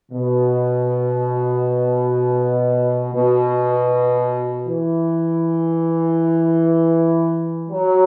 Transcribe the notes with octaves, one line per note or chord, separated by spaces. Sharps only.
B2
B2
E3
F#3